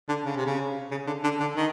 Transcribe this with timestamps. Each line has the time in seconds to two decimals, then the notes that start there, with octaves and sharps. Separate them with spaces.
0.09 D3
0.25 C#3
0.36 C3
0.46 C#3
0.91 C#3
1.07 D3
1.24 D3
1.40 D3
1.56 D#3